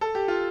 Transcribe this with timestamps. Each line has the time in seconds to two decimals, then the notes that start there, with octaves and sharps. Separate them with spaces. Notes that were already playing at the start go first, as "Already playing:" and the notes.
0.01 A4
0.15 G4
0.28 F4